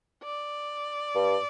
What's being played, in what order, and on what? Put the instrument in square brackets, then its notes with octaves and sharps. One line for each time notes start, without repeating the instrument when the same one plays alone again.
[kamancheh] D5
[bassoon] G2